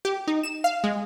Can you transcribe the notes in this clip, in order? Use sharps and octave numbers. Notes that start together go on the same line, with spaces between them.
G4
D#4
E7
F5
G#3